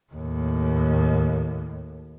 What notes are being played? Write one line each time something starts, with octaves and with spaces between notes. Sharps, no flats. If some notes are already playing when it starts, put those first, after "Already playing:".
D#2 A2